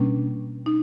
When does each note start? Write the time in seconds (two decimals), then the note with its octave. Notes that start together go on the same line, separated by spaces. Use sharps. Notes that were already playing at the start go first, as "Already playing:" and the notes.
Already playing: B2 G3 A#3 C#4 D4
0.66 D#4